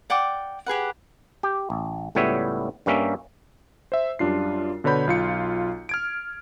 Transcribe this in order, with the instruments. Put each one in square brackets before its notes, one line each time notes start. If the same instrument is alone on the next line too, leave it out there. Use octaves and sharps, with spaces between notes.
[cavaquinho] D5 F#5 G5 D6
G4 G#4 B4 F#5
[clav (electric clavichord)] G4
A1
C#2 A2 G3 B3 C#5 E5
G2 G3 A#3 C#4 E5
[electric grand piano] C5 E5
F#2 G3 D4 F4 C7
B2 D3 B4 C#5 B5 G6
B1 F4 C#7
F6 G#6 D7